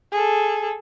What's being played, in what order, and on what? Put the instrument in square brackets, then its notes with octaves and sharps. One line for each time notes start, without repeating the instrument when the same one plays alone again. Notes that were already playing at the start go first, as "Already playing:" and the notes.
[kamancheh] G#4 A4